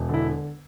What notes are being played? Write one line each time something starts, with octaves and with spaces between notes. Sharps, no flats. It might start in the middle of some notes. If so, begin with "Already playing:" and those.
Already playing: E1
D3 E4